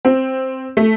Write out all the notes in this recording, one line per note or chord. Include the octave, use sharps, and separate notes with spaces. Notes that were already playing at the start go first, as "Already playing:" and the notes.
C4
A3